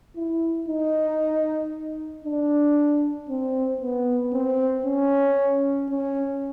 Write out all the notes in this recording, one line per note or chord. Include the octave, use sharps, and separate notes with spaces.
E4
D#4
D4
C4
B3
C4
C#4
C#4